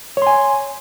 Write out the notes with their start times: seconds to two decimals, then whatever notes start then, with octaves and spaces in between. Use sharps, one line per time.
0.17 C#5
0.22 C6
0.27 G#5